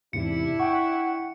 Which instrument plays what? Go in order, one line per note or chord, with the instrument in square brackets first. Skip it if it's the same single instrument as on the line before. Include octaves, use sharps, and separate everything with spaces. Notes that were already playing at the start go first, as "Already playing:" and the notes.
[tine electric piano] E2 G#2 C3 [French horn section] D4 E4 [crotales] C#7
[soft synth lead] F#5 [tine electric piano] G5 C#6